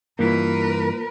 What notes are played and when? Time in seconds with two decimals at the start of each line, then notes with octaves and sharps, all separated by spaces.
0.19 G2 E3 A#3 F4 A#4 B4